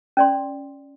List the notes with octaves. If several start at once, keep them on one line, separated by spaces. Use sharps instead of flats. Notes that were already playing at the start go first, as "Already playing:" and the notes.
C#4 D5 C6